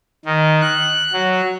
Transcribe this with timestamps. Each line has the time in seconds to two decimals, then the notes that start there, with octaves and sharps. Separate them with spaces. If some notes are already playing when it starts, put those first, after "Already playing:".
0.25 D#3
0.61 F#6
1.12 F#3